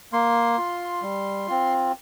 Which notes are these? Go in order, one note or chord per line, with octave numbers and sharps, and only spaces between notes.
A#3 C6
F4
G3
C4 F4